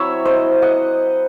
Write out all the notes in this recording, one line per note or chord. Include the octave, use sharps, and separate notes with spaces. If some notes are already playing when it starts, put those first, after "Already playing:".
Already playing: F#3 C4 E4 C#5 E5
C5 D#5
D#5 F#5